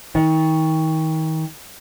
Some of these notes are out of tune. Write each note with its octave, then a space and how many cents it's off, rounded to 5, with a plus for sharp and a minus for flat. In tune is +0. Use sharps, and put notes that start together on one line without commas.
D#3 +35